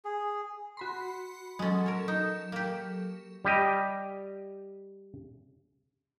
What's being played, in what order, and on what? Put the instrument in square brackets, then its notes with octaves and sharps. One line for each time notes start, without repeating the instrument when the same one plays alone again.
[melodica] G#4
[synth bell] F#4 B5 C6
[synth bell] F#3 A4 [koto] G#3 C#4
[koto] A#4 C#5
D#4
A#3 G4
[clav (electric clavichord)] G3 G4 D#5